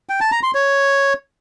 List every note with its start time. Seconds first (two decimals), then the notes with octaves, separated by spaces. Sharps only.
0.09 G5
0.21 A5
0.32 A#5
0.43 C6
0.54 C#5